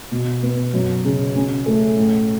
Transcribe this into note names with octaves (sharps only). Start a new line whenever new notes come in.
B2
B3
F#2
C#3
C#4
A3
A2